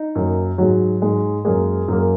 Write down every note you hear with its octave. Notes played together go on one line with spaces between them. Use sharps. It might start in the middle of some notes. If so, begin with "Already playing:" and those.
Already playing: D#4
F#2 F#3 A#3
G#2 F#3 G#3 F#4
G#2 G#3
F#2 F#3 G#3 A#3 G#4
F#2 F#3 A#3